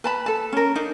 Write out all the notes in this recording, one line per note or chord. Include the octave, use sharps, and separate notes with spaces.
B4 A5 B5
A4 A5
C#4 A#4
D4 D#4